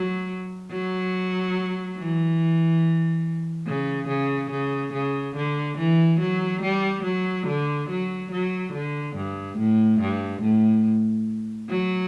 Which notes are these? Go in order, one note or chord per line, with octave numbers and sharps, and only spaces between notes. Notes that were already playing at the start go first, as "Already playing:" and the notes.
Already playing: F#3
F#3
E3
C#3
C#3
C#3
C#3
D3
E3
F#3
G3
F#3
D3
F#3
F#3
D3
G2
A2
G2
A2
F#3